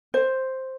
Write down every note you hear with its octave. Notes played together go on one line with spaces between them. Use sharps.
C5